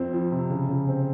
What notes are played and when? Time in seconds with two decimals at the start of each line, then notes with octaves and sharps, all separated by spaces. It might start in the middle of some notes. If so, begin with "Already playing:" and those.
Already playing: F2 C4
0.13 F3
0.32 C3
0.50 C#3
0.69 C#3
0.88 C4